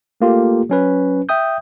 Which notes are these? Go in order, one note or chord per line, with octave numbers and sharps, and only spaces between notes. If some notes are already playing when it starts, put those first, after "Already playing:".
A3 A#3 F4 G4 A4
F#3 C#4 B4
E5 G5 D#6 G6